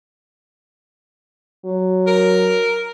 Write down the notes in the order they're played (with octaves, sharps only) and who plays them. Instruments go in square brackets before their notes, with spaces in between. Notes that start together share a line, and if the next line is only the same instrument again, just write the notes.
[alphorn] F#3
[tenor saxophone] A#4